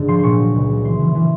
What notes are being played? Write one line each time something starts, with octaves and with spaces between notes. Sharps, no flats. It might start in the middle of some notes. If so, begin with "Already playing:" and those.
Already playing: G#2 D3
F3 C6
A#2 C6 C#6
F#3
C#2
F#3
E3 C6
E3
E3